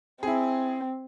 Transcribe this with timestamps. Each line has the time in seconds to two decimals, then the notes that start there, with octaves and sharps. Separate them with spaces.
0.23 C4 E4 G#4